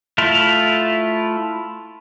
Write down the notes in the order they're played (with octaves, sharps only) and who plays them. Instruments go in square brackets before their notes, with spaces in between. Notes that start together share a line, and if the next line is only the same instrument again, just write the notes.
[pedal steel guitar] A3 E4 F4